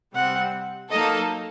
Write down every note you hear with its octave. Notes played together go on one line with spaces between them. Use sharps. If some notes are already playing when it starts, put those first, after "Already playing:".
C3 G3 C4 F#5
F#3 A#3 D#4 A4 D#5